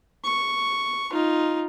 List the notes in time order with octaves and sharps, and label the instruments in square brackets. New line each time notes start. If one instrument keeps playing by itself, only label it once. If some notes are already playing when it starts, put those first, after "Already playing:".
[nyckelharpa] C#6
D#4 F4